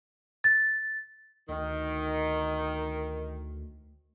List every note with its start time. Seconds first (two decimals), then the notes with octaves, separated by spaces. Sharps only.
0.44 A6
1.49 D2 D#3